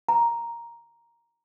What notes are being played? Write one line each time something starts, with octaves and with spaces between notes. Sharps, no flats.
A#5